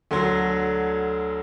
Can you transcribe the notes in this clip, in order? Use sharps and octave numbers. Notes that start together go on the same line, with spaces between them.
D2 D3 F#3 A3 C6